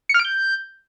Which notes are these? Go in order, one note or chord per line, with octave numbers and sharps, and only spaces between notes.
C#7
F6
D7
G6